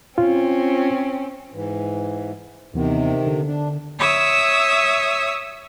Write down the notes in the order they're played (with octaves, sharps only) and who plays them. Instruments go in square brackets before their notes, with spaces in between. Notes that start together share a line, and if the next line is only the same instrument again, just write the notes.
[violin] C4 C#4 [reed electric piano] F4
[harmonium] G#2 E3
[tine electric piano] D#2 E3 B3 [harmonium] C3 D#3
[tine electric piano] D3
[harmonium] D4
[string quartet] C#5 E5 D#6 E6